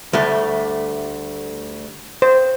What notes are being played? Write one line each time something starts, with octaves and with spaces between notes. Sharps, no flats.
D2 G3 A3
C5